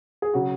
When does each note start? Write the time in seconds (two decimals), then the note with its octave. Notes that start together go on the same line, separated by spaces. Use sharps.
0.22 G#4
0.34 C#3 F#3 F#4